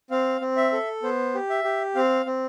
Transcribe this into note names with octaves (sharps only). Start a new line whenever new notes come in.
C4 F5
C4
E5
A4
B3 C5
G4
E5
G4
C4 F5
C4